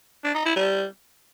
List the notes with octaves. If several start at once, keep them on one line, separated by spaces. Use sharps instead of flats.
D4
D#4
E4
G3